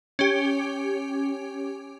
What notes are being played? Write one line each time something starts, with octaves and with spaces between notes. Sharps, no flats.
C#4 G4